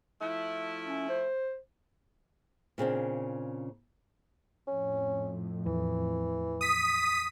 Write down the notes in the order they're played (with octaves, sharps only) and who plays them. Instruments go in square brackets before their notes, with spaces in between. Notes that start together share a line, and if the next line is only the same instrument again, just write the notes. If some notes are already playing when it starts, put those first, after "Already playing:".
[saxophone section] F3 A3 E4
[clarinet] C#4
C5
[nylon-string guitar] A#2 C#3 C4 D4
[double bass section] F2 A2 [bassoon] C#4
[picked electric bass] E2 [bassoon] E3
[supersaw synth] D#6 B6